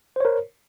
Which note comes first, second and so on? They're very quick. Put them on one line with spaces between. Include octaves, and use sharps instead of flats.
C5 C#5 A#4